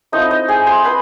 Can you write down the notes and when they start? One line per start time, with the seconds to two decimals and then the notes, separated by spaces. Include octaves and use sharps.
0.12 F3 A3 C4 D#4 E4 D#5
0.31 D#4 D#5
0.48 G#4 G#5
0.67 C5 C6
0.85 B4 B5